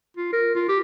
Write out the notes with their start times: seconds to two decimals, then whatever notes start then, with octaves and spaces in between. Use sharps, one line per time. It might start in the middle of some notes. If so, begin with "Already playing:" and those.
0.17 F4
0.33 A#4
0.55 F4
0.69 G4